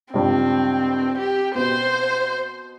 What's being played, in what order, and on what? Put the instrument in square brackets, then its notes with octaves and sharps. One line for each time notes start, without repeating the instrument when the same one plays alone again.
[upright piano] C#2 G2 [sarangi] C4
[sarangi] G4
[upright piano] B2 B3 [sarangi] C5